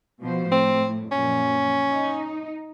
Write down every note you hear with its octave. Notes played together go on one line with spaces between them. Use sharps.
B2 F3 C5
A2 C4
F#2 A#2 F3 C#4
D#4